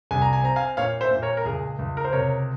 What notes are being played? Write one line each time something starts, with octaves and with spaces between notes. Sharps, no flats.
C2 G#5
A#5
G#5
C4 A#5
F5 G#5
A#2 C#5 F5
C5 E5
A#2
A#4 C#5
A#4
C#2 G#4
C#2
A#4
C5
C3 A#4 C#5